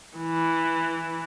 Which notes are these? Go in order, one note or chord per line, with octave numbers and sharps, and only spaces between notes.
E3